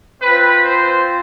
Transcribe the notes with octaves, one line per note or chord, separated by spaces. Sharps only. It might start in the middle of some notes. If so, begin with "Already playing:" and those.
C4 F4 B4
C5